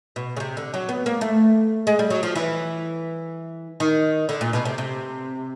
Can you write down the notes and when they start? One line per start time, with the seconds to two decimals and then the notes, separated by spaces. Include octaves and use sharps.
0.16 B2
0.37 C#3
0.40 C3
0.57 D3
0.74 F#3
0.89 B3
1.06 A#3
1.21 A3
1.87 G#3
1.99 G3
2.10 F#3
2.23 F3
2.35 E3
3.80 D#3
4.29 D3
4.41 A#2
4.53 B2
4.65 C3
4.78 C3